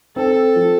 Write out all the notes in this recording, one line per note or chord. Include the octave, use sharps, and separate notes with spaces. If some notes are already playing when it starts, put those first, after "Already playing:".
C4 A4
F3